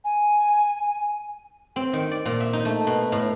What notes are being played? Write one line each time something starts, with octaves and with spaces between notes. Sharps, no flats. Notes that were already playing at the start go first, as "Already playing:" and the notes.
G#5
C4
D#3
D5
A#2
E5
D#4
A3
B2
A2